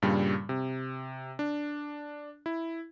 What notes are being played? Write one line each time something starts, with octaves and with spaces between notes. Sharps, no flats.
G2 A#2 C#3 G3
C3
D4
E4